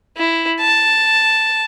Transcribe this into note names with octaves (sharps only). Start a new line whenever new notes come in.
E4
A5